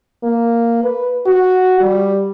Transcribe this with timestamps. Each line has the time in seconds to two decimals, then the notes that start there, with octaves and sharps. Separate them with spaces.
0.23 A#3
0.84 B4
1.26 F#4
1.81 G3